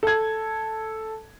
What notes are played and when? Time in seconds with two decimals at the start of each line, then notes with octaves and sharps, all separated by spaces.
0.03 A4 G#6